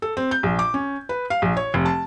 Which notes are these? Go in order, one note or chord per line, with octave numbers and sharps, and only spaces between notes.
A4
C4
G6
A#1
D6
C#4
B4
F5
A#1
C#5
F1
A5